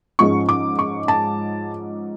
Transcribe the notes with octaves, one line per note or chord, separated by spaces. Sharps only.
G#2 F3 G#3 C#4 C#6
D6
C#6
A5